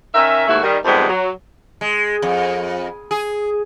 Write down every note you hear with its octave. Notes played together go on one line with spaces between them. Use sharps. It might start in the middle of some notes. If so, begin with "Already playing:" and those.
D#3 C#4 A#4 E5
D#2 G#2 A3 E4 F#4
D#3 G3
F2 G#2 C3 D#3 G3 B3
F#3
G#3
F2
G#4